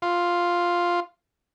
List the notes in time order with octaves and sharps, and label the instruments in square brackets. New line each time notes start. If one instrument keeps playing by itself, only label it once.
[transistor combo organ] F4